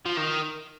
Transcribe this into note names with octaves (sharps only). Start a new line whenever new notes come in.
F3
D#3